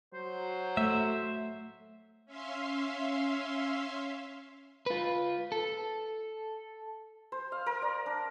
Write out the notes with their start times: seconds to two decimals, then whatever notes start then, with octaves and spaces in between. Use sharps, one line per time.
0.14 F#3 C5
0.77 A3 E5
2.26 C#4 E5 F5 C6
4.86 F4 B4
5.52 A4
7.32 C5
7.52 F5
7.66 A#4
7.82 D5
8.06 D4